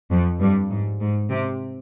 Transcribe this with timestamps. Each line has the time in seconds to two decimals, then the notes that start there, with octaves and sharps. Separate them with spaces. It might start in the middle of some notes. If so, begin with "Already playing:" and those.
0.11 F2
0.41 G2
0.70 G#2
1.01 G#2
1.30 C3